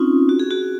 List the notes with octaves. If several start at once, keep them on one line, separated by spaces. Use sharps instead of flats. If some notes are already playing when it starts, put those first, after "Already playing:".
Already playing: C4 C#4 D#4 F4
F#4
G#4
F#4